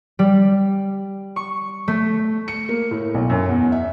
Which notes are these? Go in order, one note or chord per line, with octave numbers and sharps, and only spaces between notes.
G3
C#6
A3
C#7
A#3
A2
B1
F#2
E2
E5